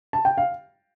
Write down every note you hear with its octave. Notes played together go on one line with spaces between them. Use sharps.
A5
G5
F5